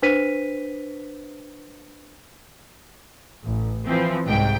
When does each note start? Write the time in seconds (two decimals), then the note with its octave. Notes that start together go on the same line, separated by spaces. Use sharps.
0.02 D4 B4 C5 B6 D#7
3.44 A1
3.87 E3 F3 C4
4.25 C2 G#2 G5